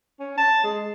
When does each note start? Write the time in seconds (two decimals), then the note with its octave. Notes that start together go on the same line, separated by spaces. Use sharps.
0.20 C#4
0.37 A5
0.63 G#3